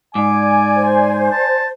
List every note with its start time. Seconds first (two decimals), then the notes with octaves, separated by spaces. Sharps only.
0.15 G#2 D5 G#5 D6
0.76 C5
1.32 A5